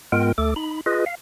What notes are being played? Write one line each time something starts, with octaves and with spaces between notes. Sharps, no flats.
G#2 G#3 B3 F4 A#4 G5
D2 A3 A4 D6
D#4 B5
F4 G#4 B4 D#5
F5